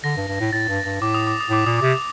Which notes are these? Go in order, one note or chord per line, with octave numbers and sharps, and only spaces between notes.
D3 A#6
G2
G2
A2
A2 A6
G2
G2
A2 D6
D#6
D6
D#6
A2 D6
A#2 D#6
C3 D6